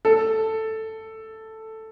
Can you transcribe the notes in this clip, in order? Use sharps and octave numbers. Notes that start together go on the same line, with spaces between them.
A4